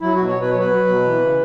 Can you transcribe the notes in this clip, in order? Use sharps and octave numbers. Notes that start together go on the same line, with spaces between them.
F#3 E4
B2 F#4
C#5
B2 B4
C#5
F#3
B4
F#3
B2
E3
C#3